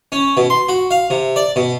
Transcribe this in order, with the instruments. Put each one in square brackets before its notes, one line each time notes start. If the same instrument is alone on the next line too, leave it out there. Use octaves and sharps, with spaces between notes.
[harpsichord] C#4
B2
C6
F#4
F5
C3
D5
B2